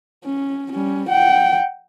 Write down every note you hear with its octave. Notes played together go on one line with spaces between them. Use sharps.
C#4
G3 C#4
F#5 G5